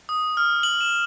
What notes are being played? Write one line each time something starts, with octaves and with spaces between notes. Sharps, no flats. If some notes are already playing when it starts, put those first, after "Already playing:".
D#6
F6
F#7
E7